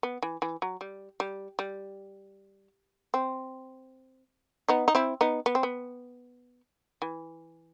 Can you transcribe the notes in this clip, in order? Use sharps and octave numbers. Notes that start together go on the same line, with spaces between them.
B3
E3
E3
F#3
G3
G3
G3
C4
B3 D#4
D#4
C4 E4
B3 D#4
B3
C4
B3
E3